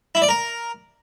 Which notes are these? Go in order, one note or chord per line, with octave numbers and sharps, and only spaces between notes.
E4
D5
A#4